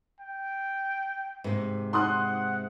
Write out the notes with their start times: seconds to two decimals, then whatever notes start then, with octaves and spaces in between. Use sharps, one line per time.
0.20 G5
1.44 G#2 C3
1.93 F#5 C6 D#6 F#6